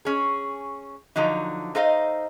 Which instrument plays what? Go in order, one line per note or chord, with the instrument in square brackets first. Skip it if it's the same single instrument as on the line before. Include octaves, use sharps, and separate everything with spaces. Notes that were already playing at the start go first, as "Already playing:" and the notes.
[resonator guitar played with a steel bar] C#4 G#4
D3 F3 F#3 D#4
D#4 A4 C5 D#5 F5